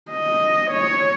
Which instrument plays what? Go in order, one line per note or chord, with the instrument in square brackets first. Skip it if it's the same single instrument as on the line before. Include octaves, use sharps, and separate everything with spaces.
[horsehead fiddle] D#5
C#5